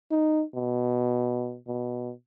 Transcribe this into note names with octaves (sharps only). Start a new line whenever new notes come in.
D#4
B2
B2